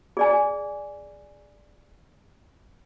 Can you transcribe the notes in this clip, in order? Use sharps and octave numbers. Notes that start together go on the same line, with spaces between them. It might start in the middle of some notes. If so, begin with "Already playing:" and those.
G#4 D5 G#5